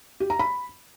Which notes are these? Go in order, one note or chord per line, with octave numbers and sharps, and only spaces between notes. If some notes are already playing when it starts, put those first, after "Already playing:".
G4
A#5
B5